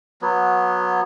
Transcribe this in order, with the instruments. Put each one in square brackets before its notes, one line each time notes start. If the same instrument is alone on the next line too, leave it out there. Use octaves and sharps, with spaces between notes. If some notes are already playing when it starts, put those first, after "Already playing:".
[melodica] F#3 B3